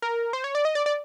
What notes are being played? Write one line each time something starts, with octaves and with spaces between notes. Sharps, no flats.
A#4
C5
C#5
D5
D#5
D5
D5